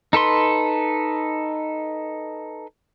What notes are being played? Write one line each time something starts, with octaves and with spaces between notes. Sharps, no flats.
D#4 A4 B4 C6